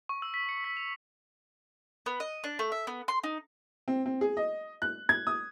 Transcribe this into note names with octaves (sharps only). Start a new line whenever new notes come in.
C#6
E6
B6
C#7
B6
F7
B3
D#5
D4
A3
E5
B3
C6
D#4
C4
C4
G#4
D#5
F#6
G#6
D#6